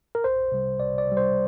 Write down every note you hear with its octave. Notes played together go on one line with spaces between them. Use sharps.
A#4
C2 C5
C3 G3
C2 D5
D5
C3 G3
C5